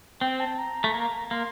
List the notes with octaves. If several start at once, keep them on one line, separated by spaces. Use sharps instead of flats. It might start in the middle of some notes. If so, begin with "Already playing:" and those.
C4 G5
A5
A#5
A3
A#3
A#3 C6